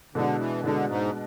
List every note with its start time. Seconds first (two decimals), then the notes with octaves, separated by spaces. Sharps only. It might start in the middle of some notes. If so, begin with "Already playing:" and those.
0.15 B2 D3 G#3 D4
0.39 E3
0.63 B2 D3 G#3 D4
0.88 G#2